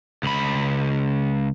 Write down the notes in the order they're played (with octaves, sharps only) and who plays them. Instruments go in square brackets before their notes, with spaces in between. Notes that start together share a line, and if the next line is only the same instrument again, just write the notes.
[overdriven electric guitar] C#2 B5